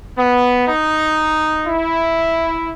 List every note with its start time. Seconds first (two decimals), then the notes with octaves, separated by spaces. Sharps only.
0.18 B3
0.68 D#4
1.66 E4